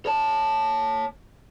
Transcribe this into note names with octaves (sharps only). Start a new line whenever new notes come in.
C#5 A5